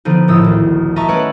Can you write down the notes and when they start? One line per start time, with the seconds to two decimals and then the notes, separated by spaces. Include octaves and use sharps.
0.05 D3 F3 B3 D#4
0.28 A#1 A2 D#6 E6
0.42 D2 D#3
0.96 D#5 E5 A5 A#5 C#6
1.08 A3 C#4 B4 C#5 D5 F#5